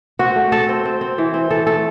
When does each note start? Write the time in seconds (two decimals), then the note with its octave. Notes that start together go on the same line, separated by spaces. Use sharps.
0.19 C4 F#4
0.36 A3
0.52 A3 A4
0.69 C4
0.85 C4
1.01 C4
1.18 E3
1.34 C4
1.50 E3 A4
1.66 A3 A4